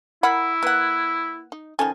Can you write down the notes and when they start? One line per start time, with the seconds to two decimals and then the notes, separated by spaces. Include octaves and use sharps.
0.23 E4 A#4 F#5 B5
0.63 A#3 B4 F#5
1.52 D#4
1.79 D#3 F3 C#4 A4 G#5